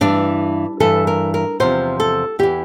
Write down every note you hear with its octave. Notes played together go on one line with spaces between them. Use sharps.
G2 E3 D4
G2 E3 A4
A#4
A#4
E2 C3 F3 C5
A4
E2 E3 G4